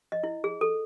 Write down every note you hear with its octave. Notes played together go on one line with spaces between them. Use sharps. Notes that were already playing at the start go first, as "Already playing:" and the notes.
D#5
E4
G#4
A4